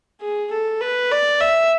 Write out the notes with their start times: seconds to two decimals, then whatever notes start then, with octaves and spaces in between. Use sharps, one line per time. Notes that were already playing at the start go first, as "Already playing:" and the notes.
0.21 G#4
0.52 A4
0.81 B4
1.11 D5
1.41 E5